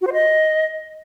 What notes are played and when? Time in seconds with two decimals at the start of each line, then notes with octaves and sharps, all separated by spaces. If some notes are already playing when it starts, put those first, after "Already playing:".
0.01 F#4
0.07 C5
0.13 D#5